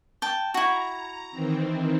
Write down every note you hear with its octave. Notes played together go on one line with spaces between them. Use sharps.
G5 A5
E4 F#4 A#5
D#3 E3 C4